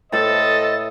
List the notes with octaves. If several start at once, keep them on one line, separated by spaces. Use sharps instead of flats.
A2 A4 B4 C5 D#5 E5 A6